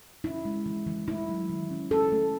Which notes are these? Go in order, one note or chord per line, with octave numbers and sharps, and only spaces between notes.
C#4 E4
G#3
E3
E3
A3 E4
F#3
D#3
C#4
C#4 A4
A3